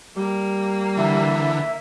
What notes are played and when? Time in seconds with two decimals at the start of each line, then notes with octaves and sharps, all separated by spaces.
0.16 G3 A#3
0.97 D3 E3 E5